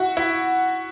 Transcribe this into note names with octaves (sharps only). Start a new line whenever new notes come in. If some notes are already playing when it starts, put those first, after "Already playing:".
Already playing: E4 F#4
E4